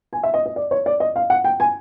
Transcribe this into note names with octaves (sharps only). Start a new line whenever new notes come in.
G#5
E5
D#5
D#5
D5
C#5
D5
D#5
F5
F#5
G5
G#5